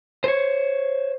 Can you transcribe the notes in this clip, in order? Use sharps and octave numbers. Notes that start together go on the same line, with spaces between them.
C5 C#5